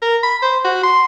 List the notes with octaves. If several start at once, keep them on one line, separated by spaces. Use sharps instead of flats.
A#4
B5
C5
F#4
C6